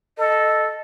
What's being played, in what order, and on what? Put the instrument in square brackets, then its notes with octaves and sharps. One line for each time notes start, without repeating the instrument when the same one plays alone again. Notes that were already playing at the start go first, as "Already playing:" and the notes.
[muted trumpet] A4 [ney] D#5